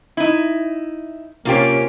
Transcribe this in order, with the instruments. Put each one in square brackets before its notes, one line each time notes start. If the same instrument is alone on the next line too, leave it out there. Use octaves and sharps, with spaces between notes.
[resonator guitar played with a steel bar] D#4 E4
[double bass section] C3 C#4 [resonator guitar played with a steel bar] A#3 F4 G4